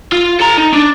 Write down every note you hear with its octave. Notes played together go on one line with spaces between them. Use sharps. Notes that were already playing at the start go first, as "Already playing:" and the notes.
F4
A4 A#5
D#4
D4